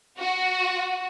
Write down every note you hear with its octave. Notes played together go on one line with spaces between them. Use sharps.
F#4